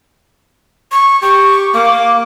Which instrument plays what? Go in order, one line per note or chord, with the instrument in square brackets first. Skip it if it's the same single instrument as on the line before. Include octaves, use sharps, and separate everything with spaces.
[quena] C#6
[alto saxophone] G4 [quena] C#6
[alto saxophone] A#3 [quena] D6